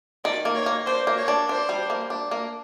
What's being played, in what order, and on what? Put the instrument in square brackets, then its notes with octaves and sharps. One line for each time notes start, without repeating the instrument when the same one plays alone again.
[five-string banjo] D#3 [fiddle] D5
[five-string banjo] A#3
[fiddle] C#5
[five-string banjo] A#3
[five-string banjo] D4 [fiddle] C5
[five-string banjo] A#3
[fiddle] C#5
[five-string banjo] D4
[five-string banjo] D4 [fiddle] C5
[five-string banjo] G3
A#3
D4
A#3